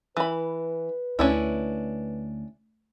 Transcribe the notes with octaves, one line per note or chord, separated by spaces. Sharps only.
E3 B4 B5
D2 C#4 D4 E4